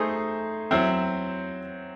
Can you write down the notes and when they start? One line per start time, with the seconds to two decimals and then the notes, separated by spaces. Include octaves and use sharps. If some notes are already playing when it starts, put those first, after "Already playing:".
Already playing: A3 D#4 G#4 C5
0.71 F#3 C4 E4 C5